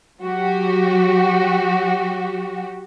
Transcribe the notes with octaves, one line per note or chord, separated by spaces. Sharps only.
F#3 F#4 G4